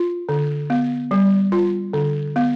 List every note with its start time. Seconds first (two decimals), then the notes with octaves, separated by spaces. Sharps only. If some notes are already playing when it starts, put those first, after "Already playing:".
Already playing: F4
0.29 D3
0.70 B3
1.11 G3
1.52 F4
1.93 D3
2.36 B3